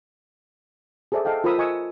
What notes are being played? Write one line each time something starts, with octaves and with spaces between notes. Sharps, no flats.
G#4 A4 C5 D5 E5
A4 D#5 F5 G5
F4 A#4 C5 B5 D#6 E6
D#5 G#5 C#6 D#6 E6